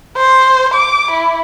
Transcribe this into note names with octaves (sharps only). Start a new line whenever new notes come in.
C5
D6
E4